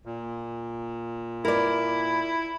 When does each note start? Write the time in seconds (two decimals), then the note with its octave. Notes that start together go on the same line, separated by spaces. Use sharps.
0.05 A#2
1.45 E4 A#4 D5